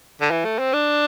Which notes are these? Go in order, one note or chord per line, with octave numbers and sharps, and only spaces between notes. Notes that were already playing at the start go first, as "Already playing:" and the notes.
D3
E3
A3
C4
D4